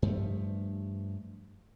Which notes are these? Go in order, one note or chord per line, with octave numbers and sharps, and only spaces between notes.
G2 F3 A3